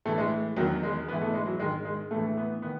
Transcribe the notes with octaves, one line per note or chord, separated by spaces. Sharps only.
A2 E3 A3
G#3
E2 D#3 F#3
G#3
G#2 E3 B3
A3
G#3
F#3
G#2 D#3 G#3
G#3
A2 E3 A3
B3
D#3 B3